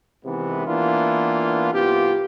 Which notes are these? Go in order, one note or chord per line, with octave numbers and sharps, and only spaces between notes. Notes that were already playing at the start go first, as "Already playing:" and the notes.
C3 D#3 E3 G#3 B3
E3 A#3 B3 D4 F4
C2 B3 F4 G4